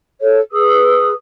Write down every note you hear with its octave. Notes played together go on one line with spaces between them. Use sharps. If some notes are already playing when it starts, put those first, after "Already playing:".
A4 C#5
G#4 B4 D#6 E6